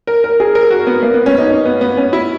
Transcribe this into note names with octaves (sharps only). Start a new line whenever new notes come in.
A#4
A#4
G#4
A#4
F#4
B3
A#3
B3
C#4
D#4
C#4
B3
B3
C#4
E4